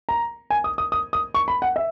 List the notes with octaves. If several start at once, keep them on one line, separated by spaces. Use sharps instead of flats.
A#5
G#5
D#6
D#6
D#6
D#6
C#6
B5
F#5
E5